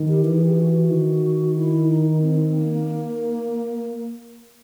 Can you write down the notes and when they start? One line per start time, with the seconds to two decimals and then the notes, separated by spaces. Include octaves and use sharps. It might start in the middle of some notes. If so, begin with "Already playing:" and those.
Already playing: D#3
0.08 G4
0.24 E3 G4
0.35 G#4
0.45 G4
0.57 F#4
0.91 D#3
1.56 E4
1.89 D#4
2.22 C4
2.56 A#3